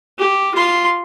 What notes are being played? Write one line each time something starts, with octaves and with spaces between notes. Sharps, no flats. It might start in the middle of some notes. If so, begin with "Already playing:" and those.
G4
F4 C6